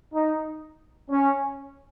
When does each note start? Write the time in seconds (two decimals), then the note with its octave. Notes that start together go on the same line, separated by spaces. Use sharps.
0.14 D#4
1.10 C#4